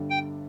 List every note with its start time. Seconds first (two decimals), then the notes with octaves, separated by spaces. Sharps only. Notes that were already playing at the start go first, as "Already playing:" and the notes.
Already playing: G1 G2 D3 G3
0.10 G5